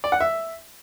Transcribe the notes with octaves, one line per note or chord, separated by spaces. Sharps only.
D5
F#5
E5